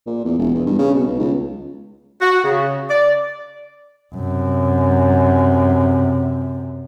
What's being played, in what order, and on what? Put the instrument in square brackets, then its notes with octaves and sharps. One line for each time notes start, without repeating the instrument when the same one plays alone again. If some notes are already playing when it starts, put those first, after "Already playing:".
[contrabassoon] A#2
E2
E1
E2
G2
C#3
B2
B1
C#2
[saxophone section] F#4
C#3
D5
[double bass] F#2 C3